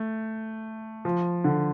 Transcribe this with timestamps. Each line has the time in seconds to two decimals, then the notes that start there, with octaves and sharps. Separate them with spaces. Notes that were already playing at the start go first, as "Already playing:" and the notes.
Already playing: A3
1.05 F3
1.44 D3